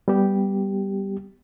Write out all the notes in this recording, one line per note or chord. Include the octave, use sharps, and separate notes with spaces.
G3 B3 G4